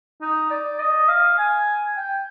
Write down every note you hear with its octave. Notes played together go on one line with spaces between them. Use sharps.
D#4
D5
D#5
F5
G#5
G5